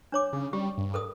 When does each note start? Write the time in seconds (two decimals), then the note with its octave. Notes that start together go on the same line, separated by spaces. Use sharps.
0.12 D4 C#5 D6
0.33 C#3
0.53 G3 G4
0.78 G2
0.94 A4 A#4 D#6